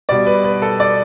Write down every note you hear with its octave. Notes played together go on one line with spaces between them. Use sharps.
B2 G3 D5
B4
B4
A4
D5